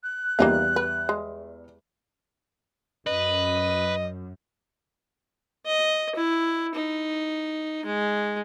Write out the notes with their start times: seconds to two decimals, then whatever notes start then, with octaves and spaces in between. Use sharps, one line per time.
0.04 F#6
0.39 E2 G3 A#3 D#4 F4
0.76 B4
1.09 G#3
3.07 F#2 B4 D#5
5.66 D#5
6.16 E4
6.75 D#4
7.85 G#3